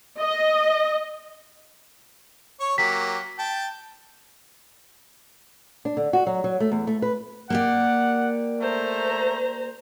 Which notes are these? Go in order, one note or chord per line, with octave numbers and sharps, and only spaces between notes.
D#5
C#5 C#6
F#3 A#3 G4 B6
G5 A5
D4
D3
F#4
F#3
F#3
A3
E2
A3
B4
A#3 G4 D5 F#5
A3 C5 A#5